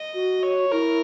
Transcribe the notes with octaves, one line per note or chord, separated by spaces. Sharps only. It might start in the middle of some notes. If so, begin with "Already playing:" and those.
Already playing: D#5
F#4
C#5
E4 A#4